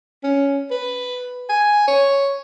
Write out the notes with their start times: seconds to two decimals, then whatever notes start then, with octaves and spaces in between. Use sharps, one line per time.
0.24 C#4
0.71 B4
1.50 G#5
1.88 C#5